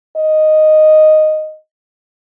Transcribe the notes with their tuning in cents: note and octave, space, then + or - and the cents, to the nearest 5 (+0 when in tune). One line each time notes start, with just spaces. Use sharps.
D#5 -5